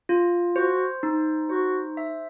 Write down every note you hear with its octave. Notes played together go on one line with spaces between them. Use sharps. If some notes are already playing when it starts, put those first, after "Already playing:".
F4
F#4 C5
D#4
F#4 C5
E5